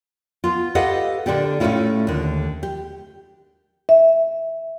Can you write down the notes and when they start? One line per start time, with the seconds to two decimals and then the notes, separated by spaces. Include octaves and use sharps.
0.44 B3 F4
0.75 G4 A4 B4 D#5 F5 F#5
1.26 A#2 D3 D4 G4 A4
1.60 A2 A3 C4 C#4 E4 F4
2.07 D#2 D3
2.63 G4
3.89 E5